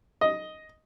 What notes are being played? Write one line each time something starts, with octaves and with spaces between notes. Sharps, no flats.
D#5